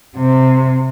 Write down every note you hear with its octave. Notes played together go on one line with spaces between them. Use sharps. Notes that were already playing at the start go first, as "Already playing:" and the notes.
C3